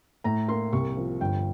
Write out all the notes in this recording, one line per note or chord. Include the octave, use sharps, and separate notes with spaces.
A2 A#5
A#3 C6
C2 C#6
F3
G1 G5